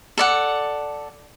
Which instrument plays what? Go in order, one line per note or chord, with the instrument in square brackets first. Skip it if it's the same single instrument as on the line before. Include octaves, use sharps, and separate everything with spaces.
[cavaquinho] A4 D5 F#5